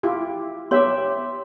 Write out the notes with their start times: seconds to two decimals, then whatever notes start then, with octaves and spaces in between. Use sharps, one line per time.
0.03 E4 F4 G4
0.71 B3 G4 C#5 E5 C6